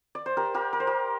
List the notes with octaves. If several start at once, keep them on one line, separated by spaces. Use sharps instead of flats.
D5
C5
G4 A#4
G4 A#4
A#4
C5
G4 A#4